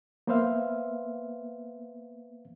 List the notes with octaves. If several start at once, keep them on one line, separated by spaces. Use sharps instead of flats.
A#3 B3 B4 C5 E5 F5